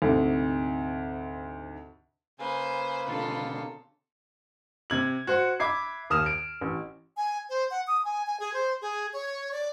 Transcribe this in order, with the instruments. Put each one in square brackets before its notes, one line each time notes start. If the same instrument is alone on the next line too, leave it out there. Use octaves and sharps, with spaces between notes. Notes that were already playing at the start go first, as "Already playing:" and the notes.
[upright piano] D2 G#2 C3
[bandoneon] C#3 A#3 [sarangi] B4 [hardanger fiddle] C5 G#5
[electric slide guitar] B2 D3 [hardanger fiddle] F4 A4
[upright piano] C3 G#6 F#7
F#4 C5 F#5
E5 B5 D6 G#6 C7
D#2 D#6 F6 E7
D7
A1
[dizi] G#5
C5
F#5
D#6
G#5
G#5
G#4
C5
G#4
C#5
D5